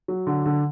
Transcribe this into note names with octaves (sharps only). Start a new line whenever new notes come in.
F#3
D3
D3